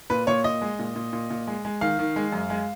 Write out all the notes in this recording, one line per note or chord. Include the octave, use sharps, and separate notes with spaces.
A#2 B4
A#2 C#5
A#2 D#5
G#3
A#2
A#2
A#2
A#2
G#3
G#3
D#3 F5
D#3
G#3
F#2
G#3